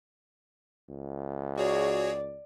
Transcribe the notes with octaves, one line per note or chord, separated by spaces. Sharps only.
C#2
F#4 G#4 C#5 D5